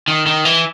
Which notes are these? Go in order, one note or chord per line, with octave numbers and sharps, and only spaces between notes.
D#3
D#3
E3